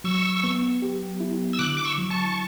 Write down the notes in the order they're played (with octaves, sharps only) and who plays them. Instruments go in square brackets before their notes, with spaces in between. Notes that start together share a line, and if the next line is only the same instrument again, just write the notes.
[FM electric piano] F#3 [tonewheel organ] C#6 E6
[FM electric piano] B3
G4
E4
[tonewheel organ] E6
[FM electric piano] D3 [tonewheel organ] D6 F#6
[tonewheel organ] D6
C#6 E6
[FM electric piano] F#3
[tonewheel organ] A5 C#6